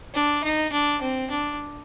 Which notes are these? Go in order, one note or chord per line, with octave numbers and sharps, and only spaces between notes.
D4
D#4
D4
C4
D4